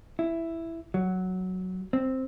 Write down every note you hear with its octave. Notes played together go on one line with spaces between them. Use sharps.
E4
F#3
C4